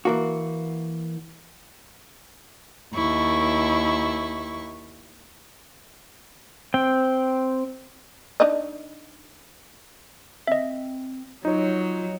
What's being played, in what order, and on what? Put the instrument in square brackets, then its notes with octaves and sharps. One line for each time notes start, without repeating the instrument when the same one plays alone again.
[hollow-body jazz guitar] E3 A#3 F#4
[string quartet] D#2 E4 C#6
[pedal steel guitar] C4 G5
[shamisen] D4 D#4 D#5
[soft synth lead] C4 [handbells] D#5 E5
[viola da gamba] F#3 [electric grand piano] D#4 C#5 [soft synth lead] F4